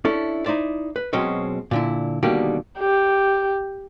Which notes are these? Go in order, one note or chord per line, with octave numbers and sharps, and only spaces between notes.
C#4 D4 E4 A4
D#4 E4 C5 D5
B4
B2 F#3 G#3 C4 C#4 D#5
A#2 D3 E4
B2 D3 D#3 G3 A#3 G4
G4